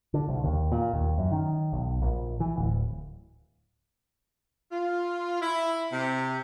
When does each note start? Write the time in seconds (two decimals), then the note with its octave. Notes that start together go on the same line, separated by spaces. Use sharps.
0.14 D3
0.28 C2
0.44 D#2
0.72 A#2
0.93 D#2
1.18 F#2
1.32 D#3
1.73 B1
2.02 A#1
2.40 E3
2.56 D1
4.72 F4
5.42 E4
5.92 C3